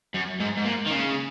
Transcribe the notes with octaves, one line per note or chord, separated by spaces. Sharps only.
F#2
G#2
G#2
A#2
D#3
C#3